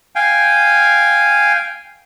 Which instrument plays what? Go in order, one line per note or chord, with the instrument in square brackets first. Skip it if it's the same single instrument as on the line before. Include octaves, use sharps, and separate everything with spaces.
[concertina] F5 G5 G#5